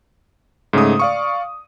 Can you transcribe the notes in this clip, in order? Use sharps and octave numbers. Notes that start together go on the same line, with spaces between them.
G#2 C#3 A3 D#6
D5 F5 C#6